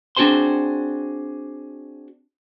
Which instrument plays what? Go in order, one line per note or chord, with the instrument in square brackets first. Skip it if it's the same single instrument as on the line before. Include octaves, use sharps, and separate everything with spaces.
[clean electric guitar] C4 D4 F#4 G#4 C5 C6